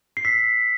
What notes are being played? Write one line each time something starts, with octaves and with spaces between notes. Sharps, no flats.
C7
E6 B6